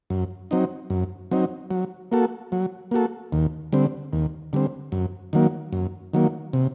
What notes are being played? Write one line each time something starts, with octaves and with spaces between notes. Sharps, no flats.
F#2
F#3 C4 D#4
F#2
F#3 C4 D#4
F#3
A#3 F#4 A4
F#3
A#3 F#4 A4
D#2
D3 G3 C4
D#2
D3 G3 C4
F#2
D#3 F#3 A#3
F#2
D#3 F#3 A#3
C3